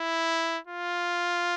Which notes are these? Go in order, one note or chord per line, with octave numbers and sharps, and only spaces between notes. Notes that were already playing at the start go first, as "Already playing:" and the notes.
Already playing: E4
F4